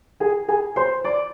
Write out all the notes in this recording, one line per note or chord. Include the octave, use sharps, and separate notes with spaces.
G#4 G#5
G#4 G#5
C5 C6
D5 D6